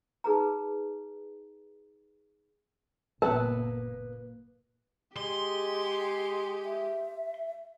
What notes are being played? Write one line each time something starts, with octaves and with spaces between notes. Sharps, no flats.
D#4 G#4 B4 A#5
F#1 A#2 A#3 B3 A#4 B4 F#5 A5
G#3 G4 C6
E5